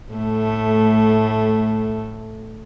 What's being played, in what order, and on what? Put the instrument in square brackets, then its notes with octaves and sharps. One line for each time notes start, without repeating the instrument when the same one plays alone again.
[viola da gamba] A2 A3